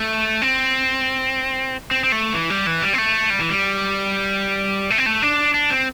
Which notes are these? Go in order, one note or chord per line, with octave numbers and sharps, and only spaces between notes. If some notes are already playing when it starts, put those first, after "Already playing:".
Already playing: A3
C4
C4
C4
A3
E3
G3
E3
G3
C4
A3
G3
E3
G3
A3
C4
A3
D4
D4
C4